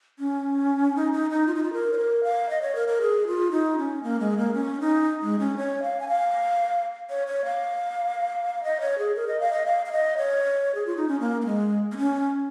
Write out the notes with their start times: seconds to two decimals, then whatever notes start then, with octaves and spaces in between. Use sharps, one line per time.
0.19 C#4
0.96 D#4
1.13 D#4
1.31 D#4
1.47 F4
1.55 D#4
1.63 F4
1.73 A#4
1.93 C#5
1.98 A#4
2.23 F5
2.49 D#5
2.62 C#5
2.75 A#4
2.88 A#4
3.01 G#4
3.27 F4
3.51 D#4
3.78 C#4
4.03 A#3
4.20 G#3
4.38 A#3
4.54 C#4
4.80 D#4
5.22 G#3
5.39 C#4
5.57 C#5
5.83 F5
6.00 G#5
6.08 F5
7.10 C#5
7.27 C#5
7.45 F5
8.64 D#5
8.81 C#5
8.98 G#4
9.15 A#4
9.28 D#5
9.40 F5
9.53 D#5
9.66 F5
9.86 F5
9.92 D#5
10.17 C#5
10.75 G#4
10.86 F4
10.97 D#4
11.08 C#4
11.20 A#3
11.41 A#3
11.46 G#3
11.92 A#3
11.97 C#4